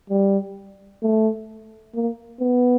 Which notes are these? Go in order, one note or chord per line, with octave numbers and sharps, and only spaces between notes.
G3
A3
A#3
B3